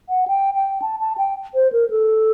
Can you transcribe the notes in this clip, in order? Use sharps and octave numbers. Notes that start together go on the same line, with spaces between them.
F#5
G5
G5
A5
A5
G5
C5
A#4
A4